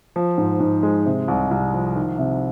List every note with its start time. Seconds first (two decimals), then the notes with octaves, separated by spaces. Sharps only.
0.16 F3
0.38 G#2
0.60 G#2
0.83 G#3
1.06 C3
1.28 C2
1.51 C2
1.74 F3
1.96 D#3
2.18 C3